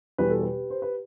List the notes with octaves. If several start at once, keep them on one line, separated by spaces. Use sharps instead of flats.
E2 B2 G3 B4
A4
G4 B4
C5
B4